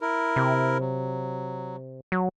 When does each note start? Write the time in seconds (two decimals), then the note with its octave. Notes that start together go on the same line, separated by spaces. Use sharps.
0.01 E4 A#4
0.36 C3
0.81 F#3
2.12 F#3